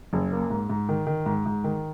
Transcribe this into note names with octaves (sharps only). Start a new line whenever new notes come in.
F#1
A#3
G#2
G#2
D#3
D#3
G#2
G#2
D#3